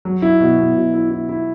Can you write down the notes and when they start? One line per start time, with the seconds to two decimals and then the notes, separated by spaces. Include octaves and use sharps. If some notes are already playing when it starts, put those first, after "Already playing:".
0.05 F#3
0.22 E4
0.40 B2
0.58 B2
0.75 B2
0.94 E4
1.11 E4
1.29 E4